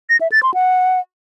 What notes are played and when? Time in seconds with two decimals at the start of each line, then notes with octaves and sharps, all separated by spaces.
0.10 A#6
0.21 E5
0.32 A6
0.43 C6
0.54 F#5